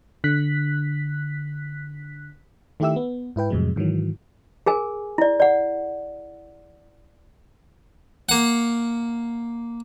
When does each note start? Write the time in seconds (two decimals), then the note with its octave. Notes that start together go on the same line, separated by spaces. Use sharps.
0.24 D3 F#6 B6
2.80 D#3 A3 E4 G4 E5 E6
2.96 B3
3.36 G#2 E4 B4 G5
3.50 F2 A2 C3 F#3 G#3
3.76 G#2 D#3 E3 F#3
4.66 G#4 A#4 G#5
5.18 E4 D5
5.40 D5 F#5
8.29 A#3 F#5